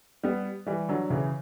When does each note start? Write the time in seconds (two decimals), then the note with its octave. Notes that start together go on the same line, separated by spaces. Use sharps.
0.23 G3 B3
0.66 E3 G3
0.89 D3 F#3
1.10 C#3 E3